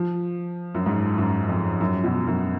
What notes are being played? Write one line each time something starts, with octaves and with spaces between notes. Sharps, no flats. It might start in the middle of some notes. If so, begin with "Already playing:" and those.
Already playing: F3
F#2
G#2
F#2
F2
F#2
B2
F#2